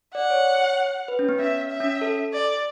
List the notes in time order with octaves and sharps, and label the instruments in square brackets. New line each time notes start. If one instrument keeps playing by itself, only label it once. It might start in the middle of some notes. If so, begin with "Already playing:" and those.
[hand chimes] D5 [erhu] F#5
[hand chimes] C#5
B4
C#4
B3
[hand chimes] C#4 [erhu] E5
[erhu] E5
[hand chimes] C#4
A4
[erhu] D5